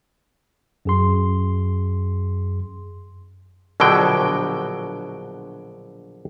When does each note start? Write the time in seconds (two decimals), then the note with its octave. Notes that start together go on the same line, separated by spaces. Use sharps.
0.85 F#2 G#4 C6
3.80 A#1 B2 D3 F#3 G5